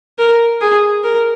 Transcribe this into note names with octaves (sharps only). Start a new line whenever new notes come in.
A#4
G#4
A#4